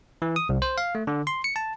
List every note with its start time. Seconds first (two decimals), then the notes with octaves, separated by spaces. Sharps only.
0.22 E3
0.36 D#6
0.49 C2
0.62 C5
0.78 F5
0.95 A3
1.07 D3
1.27 C6
1.44 C#7
1.56 A5